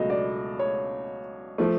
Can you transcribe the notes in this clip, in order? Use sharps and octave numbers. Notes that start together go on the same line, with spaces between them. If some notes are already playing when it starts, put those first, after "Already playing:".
Already playing: C#2 B2 F#3 A3 D#5
D5
C#5
F3 A3